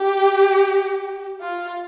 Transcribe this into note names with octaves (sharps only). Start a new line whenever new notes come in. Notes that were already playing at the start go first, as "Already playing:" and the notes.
Already playing: G4
F4